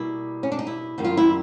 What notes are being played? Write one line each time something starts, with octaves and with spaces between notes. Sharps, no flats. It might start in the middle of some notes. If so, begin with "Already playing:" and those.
Already playing: B2 G3 A#3 E4
C#4
D4
D#4
E4
F#2 D#3 G3 A#3
F4
E4